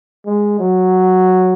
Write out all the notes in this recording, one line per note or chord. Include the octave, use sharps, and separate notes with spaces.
G#3
F#3